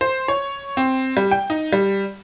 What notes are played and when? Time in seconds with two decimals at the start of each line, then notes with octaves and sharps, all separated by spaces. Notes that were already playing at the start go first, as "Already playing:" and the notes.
0.01 C5
0.28 C#5
0.77 C4
1.17 G3
1.31 G5
1.50 D#4
1.73 G3